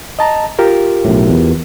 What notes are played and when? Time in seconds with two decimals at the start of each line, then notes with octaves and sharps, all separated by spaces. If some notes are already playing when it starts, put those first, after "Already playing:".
0.19 D#5 A5 A#5
0.59 F4 G4 A#4
1.05 B1 A2
1.30 E2